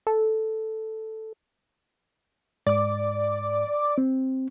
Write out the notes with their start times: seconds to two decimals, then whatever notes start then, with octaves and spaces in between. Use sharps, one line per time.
0.07 A4
2.67 G#2 D5 D6
3.98 C4